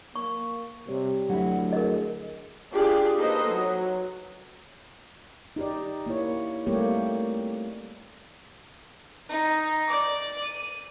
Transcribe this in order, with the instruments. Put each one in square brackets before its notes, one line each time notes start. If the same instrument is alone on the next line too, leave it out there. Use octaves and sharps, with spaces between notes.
[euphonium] A#3 [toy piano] C#6
[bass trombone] C3 [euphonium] G3 [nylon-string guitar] C#5
[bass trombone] D2 [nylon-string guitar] F#3 E4
[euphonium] G#4 [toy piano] A#4 D#5
[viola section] D4 F4 G4 G#4 D5
A#3 D#4 A4 B4 C5 D#5
F#3
[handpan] D#4 G4 D5
A#3 E4 C#5
G3 A3 A#3 C4 G4 C#5
[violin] D#4
D5 D6
D#7